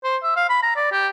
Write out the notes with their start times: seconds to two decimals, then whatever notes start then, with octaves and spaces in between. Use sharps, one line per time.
0.04 C5
0.23 E5
0.36 F5
0.49 B5
0.63 A#5
0.76 D5
0.92 G4